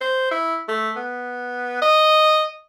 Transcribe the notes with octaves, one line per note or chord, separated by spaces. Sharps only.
C5
E4
A3
B3
D#5